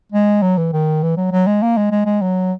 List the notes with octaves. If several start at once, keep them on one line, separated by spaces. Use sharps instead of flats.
G#3
F#3
E3
D#3
E3
F#3
F#3
G#3
A#3
G#3
G#3
G#3
F#3